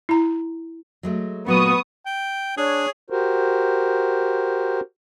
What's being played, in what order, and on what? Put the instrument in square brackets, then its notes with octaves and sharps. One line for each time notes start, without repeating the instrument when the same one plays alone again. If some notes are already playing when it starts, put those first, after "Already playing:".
[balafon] E4 A#5
[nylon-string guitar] F#3 G#3 A3
[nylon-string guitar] A#2 F#3 A3 [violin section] B3 C#6 D#6
[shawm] G5
[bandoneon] D4 [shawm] G#4 [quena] C#5
[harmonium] F#4 G4 A#4 C5